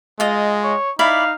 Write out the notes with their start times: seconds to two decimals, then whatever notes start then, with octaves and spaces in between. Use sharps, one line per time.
0.20 G#3 F4 D#5
0.64 C#5
0.99 D#4 E4 D5 F5 B5